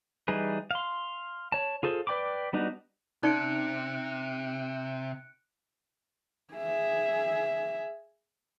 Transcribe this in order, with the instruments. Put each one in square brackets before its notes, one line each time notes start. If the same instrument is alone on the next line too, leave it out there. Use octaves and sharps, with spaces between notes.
[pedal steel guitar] E3 G3 D#4 G#4 B4
F5 C6
C#5 A5
F4 G#4 A4 C5
B4 D5 G5 B5 D6
G3 B3 D4 D#4 F#4
[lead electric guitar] C3 [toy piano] C#4 D#4 D5 [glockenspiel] F#6 C#7 D7
[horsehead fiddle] G#4 E5